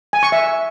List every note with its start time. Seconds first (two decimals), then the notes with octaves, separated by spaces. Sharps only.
0.13 G#5
0.23 C#6
0.32 E5